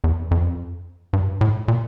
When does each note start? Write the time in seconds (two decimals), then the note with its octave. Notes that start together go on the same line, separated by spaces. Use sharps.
0.04 E2
0.31 F2
1.13 G2
1.41 A2
1.68 A#2